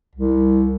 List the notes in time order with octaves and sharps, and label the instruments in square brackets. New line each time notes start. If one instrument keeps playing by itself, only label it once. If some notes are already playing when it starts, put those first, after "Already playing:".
[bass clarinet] C2